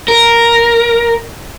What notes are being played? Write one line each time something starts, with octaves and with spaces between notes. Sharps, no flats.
A#4